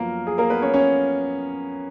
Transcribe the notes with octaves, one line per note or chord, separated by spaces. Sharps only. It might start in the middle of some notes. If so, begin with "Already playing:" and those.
Already playing: F#2 F3 A#3 B3 A#4
G#4
A#3 A#4
B3 B4
C#4 C#5
C#4 C#5